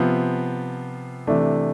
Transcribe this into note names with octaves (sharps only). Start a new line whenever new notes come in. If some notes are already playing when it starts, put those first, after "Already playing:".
Already playing: C3 F3 B3 F4
C3 E3 A3 D4